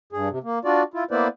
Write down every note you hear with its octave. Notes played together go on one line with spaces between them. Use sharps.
G2 G#4
C3
A#3
D4 F4 F#4 D5
E4 F4
A#3 B3 E4 B4 C5 D5